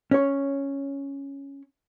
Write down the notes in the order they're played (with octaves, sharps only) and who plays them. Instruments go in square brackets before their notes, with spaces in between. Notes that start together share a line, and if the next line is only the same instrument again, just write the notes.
[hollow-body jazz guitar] C#4 C#5